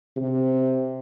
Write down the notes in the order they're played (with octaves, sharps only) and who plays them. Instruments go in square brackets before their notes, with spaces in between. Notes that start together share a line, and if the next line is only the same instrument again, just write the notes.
[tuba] C3